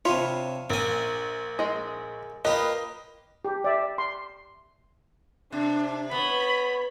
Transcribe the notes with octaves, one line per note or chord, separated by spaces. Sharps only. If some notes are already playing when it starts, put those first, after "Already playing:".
C3 D4 F4 C#5 B5
A#1 A#3 G#5
G#3 D#5
A#3 F4 G4 B4 D#5
G4
D5 E5
C6
C3 D4
B3 C#5 B5